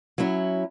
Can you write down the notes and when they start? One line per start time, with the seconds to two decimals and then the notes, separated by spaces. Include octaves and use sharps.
0.18 F#3 C#4 E4